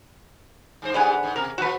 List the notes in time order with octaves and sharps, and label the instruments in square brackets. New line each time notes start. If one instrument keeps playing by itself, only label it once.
[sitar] G2 C5
[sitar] G#2 G3 G#3 [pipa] D3 B3 G#5
[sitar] G#2
[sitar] B2 [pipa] A#4
[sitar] A#2 F3 [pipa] F#4 B4